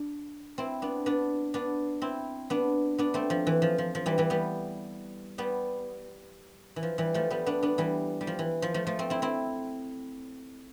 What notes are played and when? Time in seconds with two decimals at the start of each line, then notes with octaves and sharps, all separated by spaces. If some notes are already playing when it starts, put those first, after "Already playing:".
Already playing: D4
0.58 C4 E4
0.82 B3 D4
1.06 B3 D4
1.54 B3 D4
2.02 C4 E4
2.50 B3 D4
2.98 B3 D4
3.14 A3 C4
3.30 F3
3.47 E3
3.62 F3
3.78 F3
3.95 F3
4.06 E3 G3
4.18 E3 G3
4.30 G3 B3
5.38 G3 B3
6.76 E3
6.83 F3
6.98 E3 G3
7.14 F3 A3
7.30 G3 B3
7.46 B3 D4
7.63 B3 D4
7.78 E3 G3
8.21 G3
8.27 F3
8.39 E3
8.62 F3
8.74 F3 A3
8.87 F3 A3
8.99 A3 C4
9.10 C4 E4
9.22 C4 E4